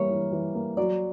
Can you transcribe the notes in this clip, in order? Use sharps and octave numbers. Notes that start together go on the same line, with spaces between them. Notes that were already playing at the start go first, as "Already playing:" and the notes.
Already playing: E3 G3 A#3 C#5
E3
E3
A#3
F#3 D5